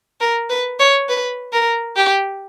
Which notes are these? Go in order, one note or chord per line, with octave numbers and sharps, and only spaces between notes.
A#4
B4
C#5
B4
A#4
G4